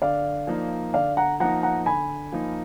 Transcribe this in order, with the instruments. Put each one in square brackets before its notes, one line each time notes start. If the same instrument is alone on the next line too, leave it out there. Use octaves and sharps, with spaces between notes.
[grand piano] D3 [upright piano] D5 F5
[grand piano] F3 A#3 D#4
[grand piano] D3 [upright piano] D5 F5
[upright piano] F#5 A#5
[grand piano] F3 A#3 D#4 [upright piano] F#5 A#5
[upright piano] F#5 A#5
[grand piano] D3 [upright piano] G#5 B5
[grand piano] F3 A#3 D#4